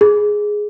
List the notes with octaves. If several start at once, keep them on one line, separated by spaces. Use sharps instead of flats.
G#4